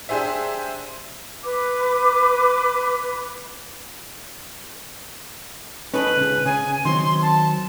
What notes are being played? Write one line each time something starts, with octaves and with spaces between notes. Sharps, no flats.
D4 G4 G#4 C5 E5
B4 D6
C#4 D#4 A4 B4
C#2 C#3
C#3 G#5
D#3 F#3 C4 C6
A5